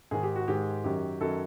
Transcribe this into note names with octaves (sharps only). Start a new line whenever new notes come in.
G#2 D#3 G#3 G#4
G4
F#4
G#2 D#3 G#3 G4
F#2 D#3 F#3 G4
F#2 D#3 F#3 A4